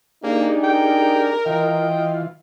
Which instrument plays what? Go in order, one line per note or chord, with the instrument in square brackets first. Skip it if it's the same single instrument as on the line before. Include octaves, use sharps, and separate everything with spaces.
[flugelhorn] A#3 [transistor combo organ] D4 G4 G#4 [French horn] D#4
[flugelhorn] A#4 [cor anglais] G5
[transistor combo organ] E3 F4 [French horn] D#5 [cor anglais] G5